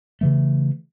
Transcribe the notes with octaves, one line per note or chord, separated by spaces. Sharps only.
C#3 E3 A3